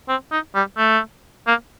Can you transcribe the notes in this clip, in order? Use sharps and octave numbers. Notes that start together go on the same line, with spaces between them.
C4
D#4
G3
A3
A#3